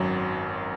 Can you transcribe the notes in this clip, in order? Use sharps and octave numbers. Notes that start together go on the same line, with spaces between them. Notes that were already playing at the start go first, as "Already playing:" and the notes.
Already playing: G#1 F#2 F#3